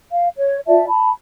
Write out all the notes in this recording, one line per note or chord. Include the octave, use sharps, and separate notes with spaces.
F5
C#5
F4 D5 E5 A5
A5 B5